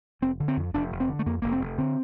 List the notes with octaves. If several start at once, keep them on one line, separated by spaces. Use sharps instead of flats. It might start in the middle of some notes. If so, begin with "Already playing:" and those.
F1 C4
D3
C4
F2
F1 D4
F1
C4
D3
A3
F2 A#3
F1 A#3
C4
F1
D3 C4